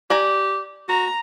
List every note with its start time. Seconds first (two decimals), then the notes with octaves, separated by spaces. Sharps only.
0.10 G4 D5 G#5 A#5
0.89 F#4 A#5